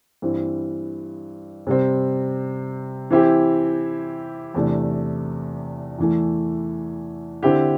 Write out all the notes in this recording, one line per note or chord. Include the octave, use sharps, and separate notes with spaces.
G2 E3 C4
C3 G3 C4
E3 C4 E4 G4
E2 C3 A3 D4
E2 E3 A3
D3 C4 E4 G4